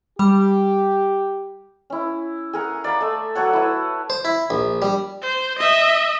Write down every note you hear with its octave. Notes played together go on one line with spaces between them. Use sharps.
G3 G4
C#4 E4
G#4 A#4 F#5
D5 F5 A#5 B5
A3 E5
F#3 A4 C#5 F#5
E4 B4
C5
E4
A#1
G3
C5
D#5 E5